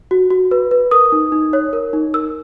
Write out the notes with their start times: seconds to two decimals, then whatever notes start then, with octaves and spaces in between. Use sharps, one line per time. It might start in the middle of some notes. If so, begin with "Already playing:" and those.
0.11 F#4
0.31 F#4
0.51 B4
0.71 B4
0.91 A#4 D#6
1.12 D#4
1.32 D#4
1.53 C#5
1.73 A#4
1.93 D#4
2.14 A#4 E6